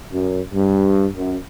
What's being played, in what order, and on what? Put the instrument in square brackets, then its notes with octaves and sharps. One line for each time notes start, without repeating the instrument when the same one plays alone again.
[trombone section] F#2
G2
F#2